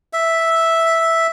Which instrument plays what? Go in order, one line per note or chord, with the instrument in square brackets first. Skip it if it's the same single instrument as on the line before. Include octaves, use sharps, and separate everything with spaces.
[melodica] E5